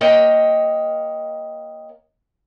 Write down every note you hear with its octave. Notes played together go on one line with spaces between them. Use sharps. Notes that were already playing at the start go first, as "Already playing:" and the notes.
A#3 C#5 D#5 G5